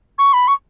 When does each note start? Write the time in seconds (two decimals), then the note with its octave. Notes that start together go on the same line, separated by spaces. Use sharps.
0.18 C#6
0.33 B5
0.48 C#6